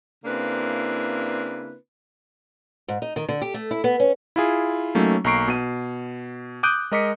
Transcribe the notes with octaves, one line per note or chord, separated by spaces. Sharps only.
C#3 A#3 C4 D4 E4 B4
G#2
D#4
D#3
D3
G4
A3
E4
B3
C#4
E4 F4 G#4
F#3 A3 A#3 C#4 D#4
B1 A#3 A#5 C#6 C7 D7
B2 D#7
D6 D#6 F#6 G6 D7 D#7
G#3 A#4 D#5 D6 B6 C#7